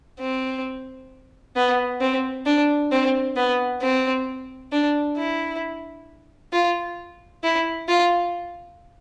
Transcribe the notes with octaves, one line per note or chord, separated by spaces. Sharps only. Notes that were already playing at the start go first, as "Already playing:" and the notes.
C4
B3
C4
D4
C4
B3
C4
D4
E4
F4
E4
F4